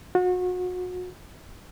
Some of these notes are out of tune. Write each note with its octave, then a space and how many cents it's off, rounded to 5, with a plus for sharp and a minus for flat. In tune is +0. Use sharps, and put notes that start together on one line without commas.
F#4 -30